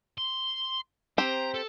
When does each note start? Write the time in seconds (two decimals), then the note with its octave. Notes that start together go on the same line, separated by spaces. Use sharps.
0.18 C6
1.18 C4 G4 C5 A#5
1.54 A4